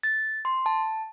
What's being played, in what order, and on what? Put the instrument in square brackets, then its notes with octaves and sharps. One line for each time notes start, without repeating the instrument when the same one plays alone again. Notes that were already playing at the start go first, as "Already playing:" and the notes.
[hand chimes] A6
C6
A5